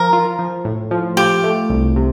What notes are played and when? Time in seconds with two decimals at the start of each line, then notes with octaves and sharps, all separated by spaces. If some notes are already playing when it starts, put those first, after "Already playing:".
Already playing: F3 A#4
0.13 F4
0.39 F3
0.65 A2
0.91 F3
1.17 F4 G4
1.44 A3
1.70 C2
1.96 C3